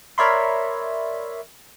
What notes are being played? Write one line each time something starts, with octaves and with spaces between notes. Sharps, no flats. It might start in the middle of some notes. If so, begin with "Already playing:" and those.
A#4 C#5 D5 E5 B5 C6